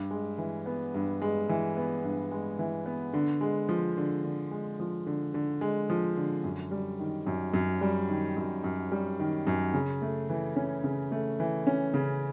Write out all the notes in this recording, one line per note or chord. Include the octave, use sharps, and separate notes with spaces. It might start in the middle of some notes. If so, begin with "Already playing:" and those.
Already playing: G2
G#3
E3
B3
G2
G#3
E3
B3
G2
G#3
E3
B3
D3
G#3
F3
D3
D3
G#3
F3
D3
D3
G#3
F3
D3
F#2
G3
D#3
F#2
F#2
G3
D#3
F#2
F#2
G3
D#3
F#2
C#3
A3
E3
C#4
C#3
A3
E3
C#4
C#3